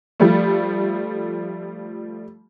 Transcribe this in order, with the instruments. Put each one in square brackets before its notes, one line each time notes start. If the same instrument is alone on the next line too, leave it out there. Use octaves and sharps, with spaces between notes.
[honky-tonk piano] F3 G3 A3